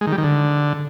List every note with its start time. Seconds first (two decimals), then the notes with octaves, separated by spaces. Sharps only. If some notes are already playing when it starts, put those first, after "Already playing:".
0.01 G#3
0.07 D#3
0.12 G3
0.18 D#3
0.24 D3